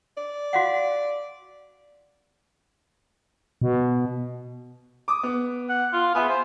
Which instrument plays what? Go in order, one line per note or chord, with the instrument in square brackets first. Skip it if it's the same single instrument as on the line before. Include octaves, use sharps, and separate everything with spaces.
[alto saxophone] D5
[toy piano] F#4 F5 F#5
[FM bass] B2
[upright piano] D6 D#6
B3
[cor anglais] F#5
F4
[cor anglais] B3 [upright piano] G#4 E5 G#5
[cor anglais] C5